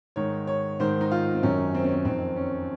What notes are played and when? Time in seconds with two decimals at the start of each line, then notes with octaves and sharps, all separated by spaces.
0.16 G#2 D#3 C#5
0.47 C#5
0.80 G#2 D#3 C5
1.01 D#4
1.11 F4
1.34 C4
1.43 F#2 D#3 C#4
1.75 C4
1.84 C#4
1.94 C4
2.05 F2 D#3 C4
2.36 C#4